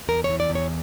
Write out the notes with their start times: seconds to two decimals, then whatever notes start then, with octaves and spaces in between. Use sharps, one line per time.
0.09 E2 A#4
0.24 C#5
0.30 E3
0.40 D5
0.50 E2
0.55 C#5